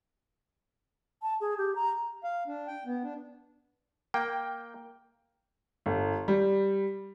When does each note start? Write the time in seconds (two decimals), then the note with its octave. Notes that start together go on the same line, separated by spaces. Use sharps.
1.22 A5
1.41 G#4
1.58 G4
1.76 A#5
2.24 F5
2.47 D4
2.67 G5
2.85 B3
3.03 D4
4.14 A#3 G5
5.86 G1
6.28 G3